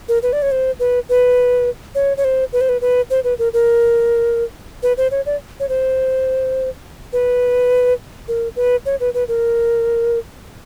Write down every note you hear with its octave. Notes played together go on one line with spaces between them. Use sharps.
A#4
B4
D5
C#5
C5
B4
B4
C#5
C#5
C5
B4
C5
B4
B4
C5
B4
A#4
A#4
B4
C5
C#5
D5
C#5
C5
B4
A#4
B4
C#5
B4
B4
A#4